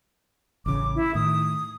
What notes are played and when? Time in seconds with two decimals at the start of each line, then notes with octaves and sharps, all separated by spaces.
0.66 A1 C#3 D6
0.95 E4
1.15 A2 D#3 D#6